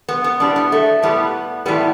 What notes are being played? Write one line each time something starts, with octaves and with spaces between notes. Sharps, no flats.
B3
B3
A2 G3 D4
B3
A3
A2 G3 B3
A2 E3 G3 B3